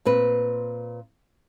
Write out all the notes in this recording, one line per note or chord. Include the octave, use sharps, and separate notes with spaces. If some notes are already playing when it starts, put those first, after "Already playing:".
A#2 C4 B4